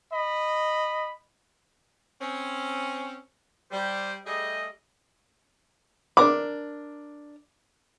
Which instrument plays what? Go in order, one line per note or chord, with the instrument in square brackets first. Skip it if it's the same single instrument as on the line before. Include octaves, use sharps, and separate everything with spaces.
[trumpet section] D#5 B5
[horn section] C4 C#4
[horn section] G3 [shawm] C5
[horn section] G3 A3 G#4 [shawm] D#5
[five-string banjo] D4 A#4 B5 [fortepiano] D6